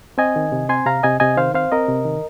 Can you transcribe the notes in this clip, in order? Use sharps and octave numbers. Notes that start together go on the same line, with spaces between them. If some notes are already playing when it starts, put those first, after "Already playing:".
C4 D#5 G#5
D#3
C3
C4 G#5 C6
C3 F5 A#5
C3 D#5 G#5
C3 D#5 G#5
D#3 C5 F5
C4 C5 F5
C4 A#4 D#5
C3
D#3